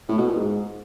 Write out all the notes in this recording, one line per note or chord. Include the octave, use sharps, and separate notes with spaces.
A2
B2
A#2
G#2